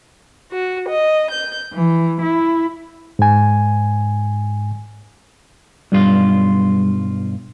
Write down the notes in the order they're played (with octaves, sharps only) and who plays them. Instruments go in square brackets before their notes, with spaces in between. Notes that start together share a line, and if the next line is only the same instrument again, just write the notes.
[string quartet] F#4
D#5
G6
E3
E4
[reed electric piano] G#2 G#5
[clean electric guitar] B1 G2 F4 [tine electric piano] G3